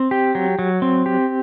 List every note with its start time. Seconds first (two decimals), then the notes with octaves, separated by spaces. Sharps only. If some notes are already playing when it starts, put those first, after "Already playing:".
Already playing: C4
0.11 G4
0.35 F#3
0.59 F#3
0.82 C4
1.06 G4